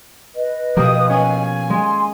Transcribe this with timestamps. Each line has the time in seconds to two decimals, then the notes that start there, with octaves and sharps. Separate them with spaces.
0.34 B4 D#5
0.77 B2 F3 A#3 G4 D#6
1.09 C#4 G#5
1.70 G#3 C6